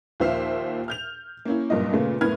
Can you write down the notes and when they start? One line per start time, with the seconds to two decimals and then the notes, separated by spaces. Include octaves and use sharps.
0.20 D#2 A#2 F3 C5 E5 F5
0.88 F6 G6 F7
1.45 A#3 C#4 E4
1.70 F#1 G2 A#2 D#5
1.93 A#2 C#3 A3 B3
2.21 F#1 A2 B3 B4 F6 G#6